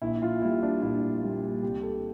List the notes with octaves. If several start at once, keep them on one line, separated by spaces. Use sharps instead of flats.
A#1 E4
F4
A#2 G3 E4
D4
A#1 E4
A#2 G3
C2 G4
A4